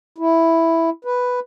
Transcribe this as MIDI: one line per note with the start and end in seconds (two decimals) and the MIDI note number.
0.18 0.90 64
1.05 1.40 71